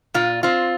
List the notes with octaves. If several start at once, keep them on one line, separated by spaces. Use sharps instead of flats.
A#2 F4
C4 F4